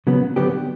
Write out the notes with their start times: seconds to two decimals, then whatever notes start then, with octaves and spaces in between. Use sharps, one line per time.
0.07 C#3 F#3 B3
0.36 D3 F#3 B3 D4 G4